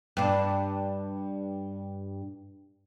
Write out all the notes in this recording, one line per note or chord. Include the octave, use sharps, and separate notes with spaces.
G2 D4